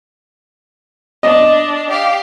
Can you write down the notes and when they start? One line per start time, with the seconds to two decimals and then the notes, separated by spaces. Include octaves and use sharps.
1.23 D4 D#5
1.91 G4 F5